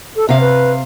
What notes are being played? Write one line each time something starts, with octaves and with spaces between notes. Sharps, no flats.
A4
C3 E5 F5
B4